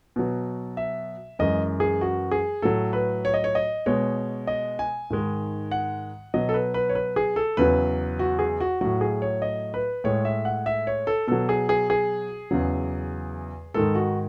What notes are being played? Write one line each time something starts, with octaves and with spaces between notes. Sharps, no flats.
B2 F#3
E5
F#2 E3 G#3 D#5
G#4
F#4
G#4
A2 F#3 A4
B4
C#5
D#5
C#5
D#5
B2 G#3 C#5
D#5
G#5
G#2 D#3 G#3
F#5
B2 F#3 D#5
A4
B4
B4
C#5
B4
G#4
A4
E2 C#3 F#3 B4
F#4
G#4
F#4
A2 F#3 F#4
G#4
C#5
D#5
B4
A2 G#3 C#5
E5
F#5
E5
C#5
A4
B2 F#3 A4
G#4
G#4
G#4
E2 C#3 F#3
G#2 D#3 G#3 A4
F#4